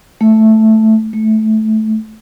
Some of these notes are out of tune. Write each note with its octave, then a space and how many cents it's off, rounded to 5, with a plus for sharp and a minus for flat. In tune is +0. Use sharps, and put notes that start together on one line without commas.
A3 +0
A3 -15